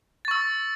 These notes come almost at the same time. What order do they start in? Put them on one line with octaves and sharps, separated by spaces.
A6 C#6 E6